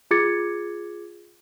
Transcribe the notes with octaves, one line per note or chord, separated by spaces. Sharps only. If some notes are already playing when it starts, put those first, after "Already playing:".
F4 G#4 D6 G#6 A6 C#7